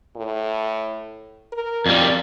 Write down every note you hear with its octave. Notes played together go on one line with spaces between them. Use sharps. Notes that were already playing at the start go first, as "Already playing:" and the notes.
A2
A#4
F2 A#2 G3